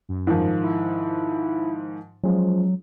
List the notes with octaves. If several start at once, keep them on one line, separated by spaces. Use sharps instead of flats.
F#2
G#2 D#3 F3
E4
F3 F#3 G#3 C#4